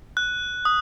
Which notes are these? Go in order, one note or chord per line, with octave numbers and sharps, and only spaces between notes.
F#6
D#6